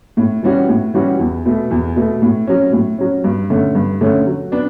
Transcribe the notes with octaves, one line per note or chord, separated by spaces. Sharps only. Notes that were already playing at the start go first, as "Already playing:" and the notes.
A2
E3 G3 C#4 F#4
A2
E3 G3 C#4 F#4
E2
B2 A3
E2
B2 A3
A2
F#3 C#4
A2
F#3 C#4
G2
D3 A3 C#4
G2
D3 A3 C#4
F#3
B3 D4